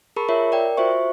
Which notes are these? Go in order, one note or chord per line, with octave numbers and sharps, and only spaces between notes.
G#4 A#4 A5 B5 C#6
F4 A#4 C#5 E5
A#4 D5 G5
F4 F#4 C5 E5 C#6